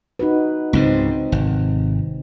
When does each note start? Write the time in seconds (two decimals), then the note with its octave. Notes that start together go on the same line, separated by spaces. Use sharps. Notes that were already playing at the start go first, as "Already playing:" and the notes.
0.19 D#4 F#4 B4
0.73 C#2 G#2 C#3 C4 D#4
1.32 G#1 C3